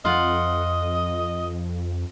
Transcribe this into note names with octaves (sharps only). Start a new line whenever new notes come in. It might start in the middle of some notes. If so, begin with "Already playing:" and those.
F2 F4 D#5 F#5